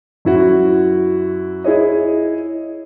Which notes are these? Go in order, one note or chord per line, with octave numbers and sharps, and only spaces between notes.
F#2 E4 F#4
E4 G#4 C#5 D#5